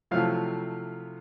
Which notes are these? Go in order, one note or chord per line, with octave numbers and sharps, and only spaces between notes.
C3 F3 F#3 A3 E4 F5